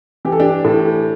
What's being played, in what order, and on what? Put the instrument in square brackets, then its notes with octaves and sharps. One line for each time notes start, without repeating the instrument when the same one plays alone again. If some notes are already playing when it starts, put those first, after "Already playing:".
[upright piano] E3 G4
A4
D4 G4
A2